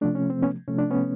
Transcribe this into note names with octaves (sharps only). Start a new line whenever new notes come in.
C3 F3 A3 D4
C#4
C4
B3 C#4
C3 F3 A3 C#4
D4
B3 C#4